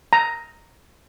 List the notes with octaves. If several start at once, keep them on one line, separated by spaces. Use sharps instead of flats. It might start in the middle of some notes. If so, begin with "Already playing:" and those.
A#5